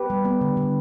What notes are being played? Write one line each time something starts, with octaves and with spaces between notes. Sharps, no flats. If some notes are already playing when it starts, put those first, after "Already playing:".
Already playing: G4 B4
G3
B3
D3
D3